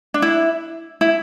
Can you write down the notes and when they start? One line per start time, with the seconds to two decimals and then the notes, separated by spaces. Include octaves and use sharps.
0.14 D4
0.22 E4
1.01 E4